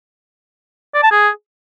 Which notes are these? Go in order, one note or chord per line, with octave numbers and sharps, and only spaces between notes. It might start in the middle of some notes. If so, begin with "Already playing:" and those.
D5
A5
G#4